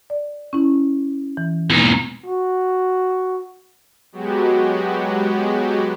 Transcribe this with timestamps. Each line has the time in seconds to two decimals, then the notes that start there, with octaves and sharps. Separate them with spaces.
0.10 D5
0.53 C#4 E4
1.37 E3
1.70 E2 B2 G#3 A#3 D#4
2.26 F#4
4.12 F#3 G#3 B3 F#4 G4